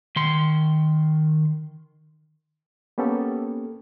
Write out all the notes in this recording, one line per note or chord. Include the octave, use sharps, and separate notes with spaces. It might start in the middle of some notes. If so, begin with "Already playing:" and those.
D#3 C6
A#3 B3 C#4 G4 A4